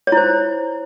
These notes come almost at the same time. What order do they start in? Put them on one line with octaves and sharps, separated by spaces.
C#5 E4 C5